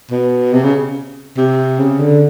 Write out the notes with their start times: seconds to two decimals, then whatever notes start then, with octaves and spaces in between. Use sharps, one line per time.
0.11 B2
0.53 C3
0.63 C#3
1.37 C3
1.79 C#3
2.00 D3